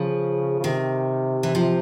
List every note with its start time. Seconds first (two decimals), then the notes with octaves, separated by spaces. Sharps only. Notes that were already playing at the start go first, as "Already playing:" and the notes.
Already playing: C#3 F3
0.60 C#3
0.64 C3 D#3
1.43 E3
1.55 F3